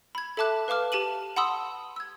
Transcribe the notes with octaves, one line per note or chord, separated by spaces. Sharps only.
B5 G#6
A4 E5 A5 D6 F#6
B4 F5 A5 D6 F6
G4 A5 D#7 F#7
F#5 A5 B5 C6 D#6 E6
E6 G#6